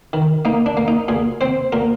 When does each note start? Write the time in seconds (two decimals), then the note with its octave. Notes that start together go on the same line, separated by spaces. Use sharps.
0.13 D#3
0.45 A#3 D#4
0.66 D4
0.77 A#3
0.88 D#4
1.08 A#2 G#4
1.41 C4 C5
1.72 A#2 A#4